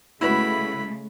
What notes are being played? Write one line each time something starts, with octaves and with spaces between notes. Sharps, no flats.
C#3 G#3 A3 E4 F#4 B4 B5